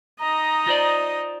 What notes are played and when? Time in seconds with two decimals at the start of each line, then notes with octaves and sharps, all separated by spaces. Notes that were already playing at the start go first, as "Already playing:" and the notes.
0.20 D#4 D#5 A#5
0.67 F4 C5 D5